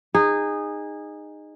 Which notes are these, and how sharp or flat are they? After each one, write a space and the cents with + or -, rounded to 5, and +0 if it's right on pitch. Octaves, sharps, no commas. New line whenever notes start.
D#4 -15 G#4 -20